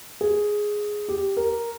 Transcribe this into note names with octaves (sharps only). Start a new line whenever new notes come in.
G#4
G4
A#4